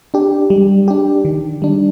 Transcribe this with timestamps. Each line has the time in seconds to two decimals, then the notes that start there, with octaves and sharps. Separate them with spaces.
0.14 D4 G4
0.50 G3
0.88 D4 G4
1.25 D#3
1.62 G3 D4